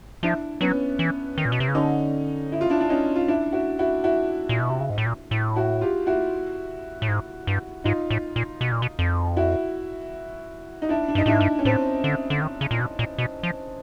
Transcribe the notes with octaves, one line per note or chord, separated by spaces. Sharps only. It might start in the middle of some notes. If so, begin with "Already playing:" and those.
F3 D4 E4
F#3 B3 C#4
E3
D#3
A#2
B2
C3
C#3
D3 C#4 D#4
E4
F4
D4 E4
D4
C#4 D#4
F4
D4 E4
E4 F#4
E4 F#4
E4 F#4
A#2
B2
C3
C#3
G#2
A2
A#2
A2
E4 F#4
F4 G4
E4 F#4
A2
G#2
G2
G#2 D#4 F4
A2
A#2
B2
A#2
B2
F2
E4 F#4
D#4
D4 E4
D4
G2
D#4
A2 D4 E4
G#2
G2
C#4
A2 C4 D4
D3
D3
D#3
C#3
A#2
B2
A#2
B2
F3